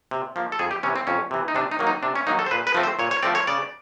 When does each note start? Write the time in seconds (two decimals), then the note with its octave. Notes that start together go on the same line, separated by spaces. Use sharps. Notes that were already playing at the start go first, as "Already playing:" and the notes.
0.11 C3
0.36 F3 A#3
0.52 A4
0.59 F2 G#4
0.71 G4
0.83 C3 E3 C#4
0.96 C4
1.07 F2 C#4
1.31 C3 E3
1.48 D#4
1.55 C3 D4
1.71 D#4
1.79 D#3 F#3 A#3
1.87 D#4
2.03 C3 D4
2.15 C#4
2.27 D#3 F#3 A#3 D#4
2.39 A4
2.46 C5
2.51 A#2 B4
2.67 B4
2.75 F3 A3 C4
2.83 C5
2.99 A#2 C#5
3.11 C#5
3.23 F3 A3 C4 D5
3.35 C#5
3.47 C#3 D5